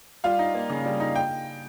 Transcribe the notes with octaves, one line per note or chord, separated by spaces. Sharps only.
G3 F4 F5
D#4
A#3
C#3
G3
D#4
G5